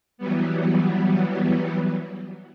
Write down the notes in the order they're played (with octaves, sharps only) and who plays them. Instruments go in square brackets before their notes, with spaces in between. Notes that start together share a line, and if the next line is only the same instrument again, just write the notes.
[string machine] E3 F#3 G3 B3